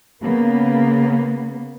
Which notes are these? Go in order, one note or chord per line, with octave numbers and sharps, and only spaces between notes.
C#3 A#3 B3